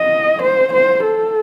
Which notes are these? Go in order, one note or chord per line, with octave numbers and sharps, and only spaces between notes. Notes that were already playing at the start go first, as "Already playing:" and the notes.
Already playing: D#5
C5
C5
A4